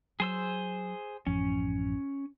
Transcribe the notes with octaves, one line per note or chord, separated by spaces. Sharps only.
F#3 G#4 C5 E6
A1 F#2 F3 C#4